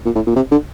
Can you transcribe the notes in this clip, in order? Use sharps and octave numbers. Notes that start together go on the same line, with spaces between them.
A#2
A2
A#2
C3
D3